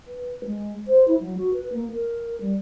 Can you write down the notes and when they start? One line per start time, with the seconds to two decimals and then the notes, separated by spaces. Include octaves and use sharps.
0.06 B4
0.45 G#3
0.87 C5
1.08 E4
1.20 F#3
1.37 F#4
1.53 B4
1.73 A#3
1.92 A#4
2.41 G3